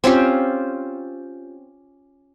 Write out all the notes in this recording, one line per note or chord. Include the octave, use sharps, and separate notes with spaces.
C4 C#4 F4 G4